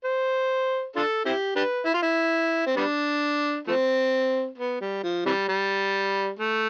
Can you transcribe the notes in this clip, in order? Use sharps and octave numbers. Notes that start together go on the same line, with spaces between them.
C5
D4 F4 A4
C4 E4 G4
D4 G4 B4
E4
F4
E4
C4
G3 B3 D4
F3 A3 C4
B3
G3
F3
C3 E3 G3
G3
A3